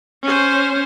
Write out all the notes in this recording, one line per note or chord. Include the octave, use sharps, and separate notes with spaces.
C#4 C5